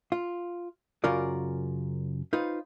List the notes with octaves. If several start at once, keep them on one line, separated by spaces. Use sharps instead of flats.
F4
F#2 C#3 C#4 F4 A#4 D5
D#4 F4 B4 C5